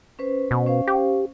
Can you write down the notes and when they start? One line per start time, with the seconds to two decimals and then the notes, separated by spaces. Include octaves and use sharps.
0.19 C#4 B4 C5
0.51 B2
0.66 C#4 C5 F5
0.87 G4